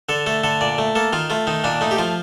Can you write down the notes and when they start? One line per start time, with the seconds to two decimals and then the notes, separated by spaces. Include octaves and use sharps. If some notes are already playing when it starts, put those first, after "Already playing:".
0.09 D3 A4
0.26 A3 A4
0.44 D3 A4
0.61 A#2 D5
0.78 A3
0.95 A#3 A4
1.13 D#3 F4
1.30 A3 F4
1.47 D#3 D#4
1.64 A#2 D4
1.81 A3 D#4
1.91 G4
1.99 F3 F4